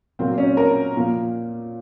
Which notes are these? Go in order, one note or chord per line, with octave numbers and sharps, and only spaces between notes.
A#2 F#3 A#3 C4
C#4
A#4
A#2 F3 A#3